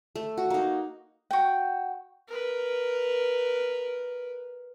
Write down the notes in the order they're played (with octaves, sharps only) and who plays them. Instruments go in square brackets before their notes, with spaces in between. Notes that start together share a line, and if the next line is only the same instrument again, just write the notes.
[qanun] A3
F#4
A#3 D#4
[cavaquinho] F#4 G5
[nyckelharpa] A#4 B4